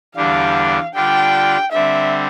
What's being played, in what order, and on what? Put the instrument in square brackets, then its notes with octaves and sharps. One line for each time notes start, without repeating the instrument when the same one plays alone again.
[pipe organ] E2 D3 G3 D4 [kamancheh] F5
[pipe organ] D3 G3 D4 F4 [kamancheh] G5
[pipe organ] D3 G3 C4 [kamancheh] E5